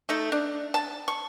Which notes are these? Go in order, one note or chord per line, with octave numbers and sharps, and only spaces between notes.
A3 D#4 A4
D4
A5
C#6